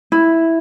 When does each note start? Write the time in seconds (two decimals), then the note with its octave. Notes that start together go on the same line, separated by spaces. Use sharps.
0.12 E4